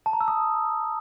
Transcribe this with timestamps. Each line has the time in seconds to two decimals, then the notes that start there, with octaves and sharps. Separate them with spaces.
0.06 A5
0.13 A#5
0.21 E6
0.28 D#6